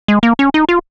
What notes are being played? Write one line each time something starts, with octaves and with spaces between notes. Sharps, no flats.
G#3
A#3
C#4
D#4
F4